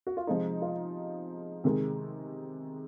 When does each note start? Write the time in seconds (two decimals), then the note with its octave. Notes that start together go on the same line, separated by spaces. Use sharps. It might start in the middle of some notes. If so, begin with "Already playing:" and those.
0.07 F#4
0.17 F4
0.27 C3 F3 G#3 D#4
0.62 F4
1.64 C3 D#3 G#3